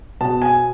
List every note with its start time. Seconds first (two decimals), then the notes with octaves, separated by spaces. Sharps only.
0.21 B2 A5
0.42 G#5